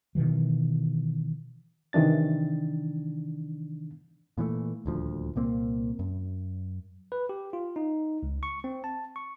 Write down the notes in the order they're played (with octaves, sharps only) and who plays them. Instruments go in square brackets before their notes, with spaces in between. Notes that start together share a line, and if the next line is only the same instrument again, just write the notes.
[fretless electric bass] B2 D#3 E3 F#3
[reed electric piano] C3 D#3 E3 D4 A6
[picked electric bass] A#2 E3 F3 A3
D#1 D2 F3
C2 A#2 A#3 C4
F#2
[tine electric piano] B4
G4
F4
D#4
C#2
C#6
C4
A5
C#6